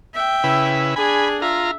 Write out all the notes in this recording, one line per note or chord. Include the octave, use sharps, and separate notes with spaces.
E5 G5
C#3 E4 B4
D4 G#4 G#5 B5
F4 E5 A#5